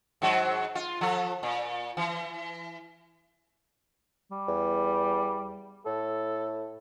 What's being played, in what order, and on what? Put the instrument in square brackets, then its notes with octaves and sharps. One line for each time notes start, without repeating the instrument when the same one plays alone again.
[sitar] G#2 F#3
F4
F3 A4
A#2
E3
[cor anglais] G3
[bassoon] E2
[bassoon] A2 [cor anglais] A4